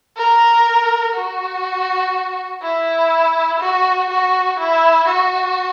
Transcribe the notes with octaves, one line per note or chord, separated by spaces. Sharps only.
A#4
F#4
E4
F#4
F#4
E4
F#4